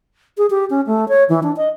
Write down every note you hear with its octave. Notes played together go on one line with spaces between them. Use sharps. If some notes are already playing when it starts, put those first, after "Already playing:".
G#4
G4
C#4
A3
C#5
E3
D4
D#5